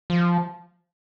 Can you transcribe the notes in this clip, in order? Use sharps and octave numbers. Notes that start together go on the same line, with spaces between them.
F3